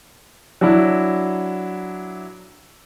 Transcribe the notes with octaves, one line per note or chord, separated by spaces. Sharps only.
F#3 D4 E4